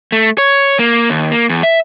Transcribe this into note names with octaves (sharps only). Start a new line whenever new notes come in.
A3
C#5
A#3
D#2
A#3
E2
E5